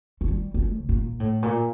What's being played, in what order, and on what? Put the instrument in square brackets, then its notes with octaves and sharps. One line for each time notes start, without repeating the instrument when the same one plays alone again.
[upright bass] A3
G3
G3
A3
C3
A#2
A2
A#2